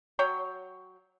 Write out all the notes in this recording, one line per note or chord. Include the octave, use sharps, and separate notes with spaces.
F#3 C#5 G5